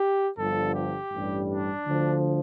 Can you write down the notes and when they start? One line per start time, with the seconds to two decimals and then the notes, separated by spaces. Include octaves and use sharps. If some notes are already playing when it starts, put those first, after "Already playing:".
Already playing: G4
0.37 G1 G2 D3 F3 A4
0.74 G4
1.12 A1 G2 G3
1.48 D4
1.86 D2 D3 F3